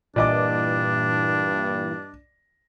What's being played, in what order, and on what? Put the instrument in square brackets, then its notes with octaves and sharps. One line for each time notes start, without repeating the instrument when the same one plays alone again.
[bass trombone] G2 [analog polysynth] A#2 E3 [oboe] D4 [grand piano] D5 D#5 D6